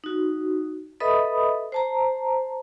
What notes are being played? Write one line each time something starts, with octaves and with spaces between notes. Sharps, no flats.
D#4 F#4
A4 B4 D#5 E5 B5 D#6
C5 A5 A#5